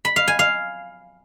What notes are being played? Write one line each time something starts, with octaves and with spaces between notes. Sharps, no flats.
B5
F5
G#5
F5